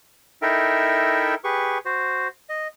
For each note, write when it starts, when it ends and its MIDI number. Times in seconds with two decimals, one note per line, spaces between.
0.42 1.35 63
0.42 1.35 64
0.42 1.35 69
0.42 1.35 70
0.42 1.35 76
0.42 1.35 79
1.44 1.78 67
1.44 1.78 68
1.44 1.78 71
1.44 1.78 85
1.85 2.28 66
1.85 2.28 72
2.49 2.68 75